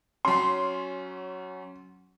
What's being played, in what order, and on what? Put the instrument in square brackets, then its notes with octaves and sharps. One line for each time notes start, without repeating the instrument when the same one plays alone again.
[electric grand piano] F#3 C#4 [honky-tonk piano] C6